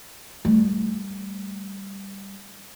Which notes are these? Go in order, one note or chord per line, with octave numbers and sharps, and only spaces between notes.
G3 A3